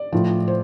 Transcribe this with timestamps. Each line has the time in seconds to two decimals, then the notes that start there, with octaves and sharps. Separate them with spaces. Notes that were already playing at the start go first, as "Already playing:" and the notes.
Already playing: D5
0.13 A2 F3
0.48 C5